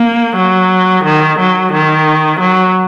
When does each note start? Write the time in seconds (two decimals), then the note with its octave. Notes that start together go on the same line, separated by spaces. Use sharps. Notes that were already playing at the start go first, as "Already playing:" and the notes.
Already playing: A#3
0.36 F#3
1.04 D#3
1.40 F#3
1.73 D#3
2.40 F#3